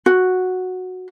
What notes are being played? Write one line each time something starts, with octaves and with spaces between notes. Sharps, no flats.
F#4